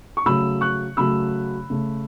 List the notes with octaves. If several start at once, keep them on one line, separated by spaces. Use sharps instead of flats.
C#6
C#3 F#3 A3 B5 E6
C#6 F#6
C#3 F#3 A3 B5 E6
C#3 A3